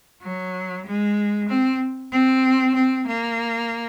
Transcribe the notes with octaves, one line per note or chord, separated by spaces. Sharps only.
F#3
G#3
C4
C4
C4
A#3